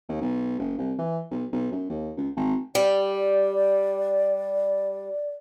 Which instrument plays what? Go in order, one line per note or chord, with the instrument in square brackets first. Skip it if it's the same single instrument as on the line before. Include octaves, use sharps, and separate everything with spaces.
[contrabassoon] D#2
B1
F#1
C2
E3
B1
B1
F#2
D#2
C#2
G#1
[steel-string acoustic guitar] G3 [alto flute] D5